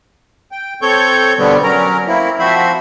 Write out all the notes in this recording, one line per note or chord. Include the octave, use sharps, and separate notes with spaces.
G5
C4 A4 C#5 C#6 G6
B2 D3 G3 B3 C4
F#3 C#4 A#4 A#5
A#3 C4 E4
F3 C4 F#4 C5 E5 B5